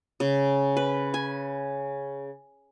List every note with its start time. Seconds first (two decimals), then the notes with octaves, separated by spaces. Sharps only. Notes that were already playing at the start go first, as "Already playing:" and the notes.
0.20 C#3
0.77 B4
1.14 G#5